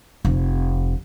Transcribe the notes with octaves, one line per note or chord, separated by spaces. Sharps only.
F1